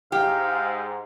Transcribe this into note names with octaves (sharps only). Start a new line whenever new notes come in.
G#2 G4 F5